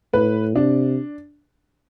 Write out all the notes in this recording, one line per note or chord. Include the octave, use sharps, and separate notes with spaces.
A2 B4
C3 D4